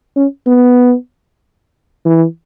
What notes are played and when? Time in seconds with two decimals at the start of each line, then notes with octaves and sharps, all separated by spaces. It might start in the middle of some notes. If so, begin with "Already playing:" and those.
0.16 C#4
0.48 B3
2.05 E3